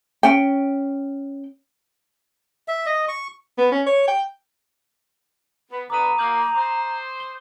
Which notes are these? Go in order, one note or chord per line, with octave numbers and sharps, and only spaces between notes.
C#4 G5
E5
D#5
C#6
B3
C#4
C#5
G5
B3
D3 B3 A#5 D6 D#6 D#7
F#3 A#3 D6 G6 F#7
C5 C6 D6
G7